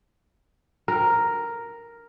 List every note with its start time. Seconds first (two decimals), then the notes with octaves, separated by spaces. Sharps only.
0.88 A#4